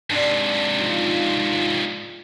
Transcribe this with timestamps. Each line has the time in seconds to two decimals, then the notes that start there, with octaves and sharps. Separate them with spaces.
0.10 G#2 C3 D4
0.78 F3 D#4 F4